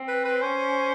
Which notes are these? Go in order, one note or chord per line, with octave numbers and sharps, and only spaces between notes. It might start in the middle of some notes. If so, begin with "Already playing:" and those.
Already playing: C4
B4
B4
C#4 C5